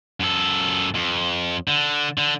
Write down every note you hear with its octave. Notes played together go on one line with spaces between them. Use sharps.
F#2 A4
F2
D3
D3